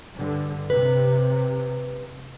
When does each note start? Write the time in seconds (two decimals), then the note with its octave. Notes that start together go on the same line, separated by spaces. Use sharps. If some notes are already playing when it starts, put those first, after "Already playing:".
0.15 G2 D3
0.70 C3 B4